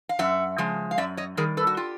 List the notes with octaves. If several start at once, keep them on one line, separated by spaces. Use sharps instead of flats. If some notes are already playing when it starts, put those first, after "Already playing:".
F5
F#2 E5 F#5
C#3 F3 G#3
F5
F#2 D5 E5
C#5 D#5
D#3 G3 G#4 A#4
A4 B4
F#4
F4 G4